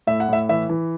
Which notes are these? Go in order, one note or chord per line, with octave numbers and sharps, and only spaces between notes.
A2 E5
F#5
A2 E5
E3 E5
E3